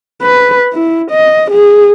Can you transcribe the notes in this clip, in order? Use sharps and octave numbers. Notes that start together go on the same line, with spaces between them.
B4
E4
D#5
G#4